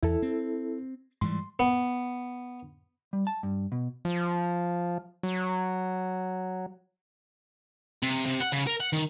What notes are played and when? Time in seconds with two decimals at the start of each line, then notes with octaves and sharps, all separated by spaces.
0.03 E2 E4 A4
0.22 C4
1.21 G#2 E3 G3 C6
1.59 B3
3.13 G3
3.27 A5
3.43 G2
3.72 B2
4.05 F3
5.23 F#3
8.03 C3
8.26 C3
8.41 F#5
8.53 C#3
8.67 A#4
8.80 F#5
8.93 D#3